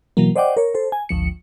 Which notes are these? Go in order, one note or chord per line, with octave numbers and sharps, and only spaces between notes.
B2 E3 F#3 A#3
C5 D5 D#5 F#5 G5 D6
A#4 C#5
A4 C5
G#5
G#1 D2 F3 C#7